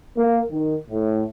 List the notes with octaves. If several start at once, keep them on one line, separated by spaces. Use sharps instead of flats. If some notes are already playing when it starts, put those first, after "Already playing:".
A#3
D#3
A2